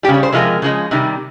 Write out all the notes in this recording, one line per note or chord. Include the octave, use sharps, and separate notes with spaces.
G3 G4
C#3
C#5
C5
C3 F3 G#3 A#4
C#3 F3 G#3
C3 D#3 G3